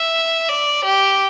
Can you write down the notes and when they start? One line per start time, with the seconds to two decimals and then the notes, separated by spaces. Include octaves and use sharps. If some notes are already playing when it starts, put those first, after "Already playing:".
Already playing: E5
0.49 D5
0.84 G4